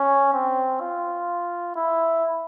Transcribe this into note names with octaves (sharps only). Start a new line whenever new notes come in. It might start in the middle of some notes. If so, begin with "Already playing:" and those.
Already playing: C#4
C4
F4
E4